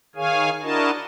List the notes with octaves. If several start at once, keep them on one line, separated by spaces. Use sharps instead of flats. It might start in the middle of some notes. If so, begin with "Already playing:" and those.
D#3 G#4 C#5 F5 G#5
D4 E4 F#4 A#4 D#5 A5